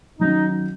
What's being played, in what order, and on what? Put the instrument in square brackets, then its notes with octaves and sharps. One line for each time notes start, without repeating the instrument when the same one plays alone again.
[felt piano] D#3 F#3 C#4 [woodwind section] D#4